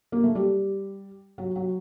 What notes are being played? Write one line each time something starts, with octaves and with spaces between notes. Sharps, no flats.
A#3
A3
G3
F#3
F#3